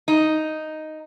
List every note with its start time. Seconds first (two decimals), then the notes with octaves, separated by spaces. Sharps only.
0.08 D#4